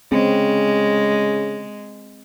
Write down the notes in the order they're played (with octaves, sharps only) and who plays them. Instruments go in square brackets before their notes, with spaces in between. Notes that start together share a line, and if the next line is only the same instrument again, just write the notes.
[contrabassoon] C#3 [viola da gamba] G#3 [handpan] C4